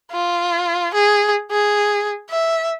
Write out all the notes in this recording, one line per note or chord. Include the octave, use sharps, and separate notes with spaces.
F4
G#4
G#4
E5